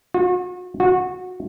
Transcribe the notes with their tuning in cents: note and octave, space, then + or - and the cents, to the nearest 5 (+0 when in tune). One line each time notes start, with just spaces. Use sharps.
F#4 -40
F#4 -20